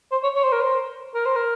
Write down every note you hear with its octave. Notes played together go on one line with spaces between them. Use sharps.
C5
C#5
C#5
C5
A#4
C5
A#4
C5
A#4